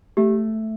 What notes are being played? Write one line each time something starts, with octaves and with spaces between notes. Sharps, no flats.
A3 G4